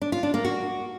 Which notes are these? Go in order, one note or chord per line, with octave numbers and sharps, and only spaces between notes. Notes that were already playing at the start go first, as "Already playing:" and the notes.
D4
F4
D4
A#3
F#4